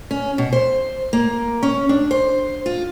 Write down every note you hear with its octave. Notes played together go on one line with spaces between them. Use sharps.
C#4
B2
C5
A#3
C#4
D4
C5
F4